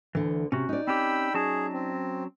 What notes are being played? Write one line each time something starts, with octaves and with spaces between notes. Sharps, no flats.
D2 D3 E3
C3 C#4 F#4
D#4 D5
C4 C#4 G4 G5 B5 E6
F#3 C#4 G#4 A5
C4